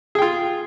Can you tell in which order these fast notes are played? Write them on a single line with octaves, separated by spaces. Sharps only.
G#4 G5 F4